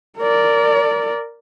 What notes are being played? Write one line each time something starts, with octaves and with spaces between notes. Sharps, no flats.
A#4 D5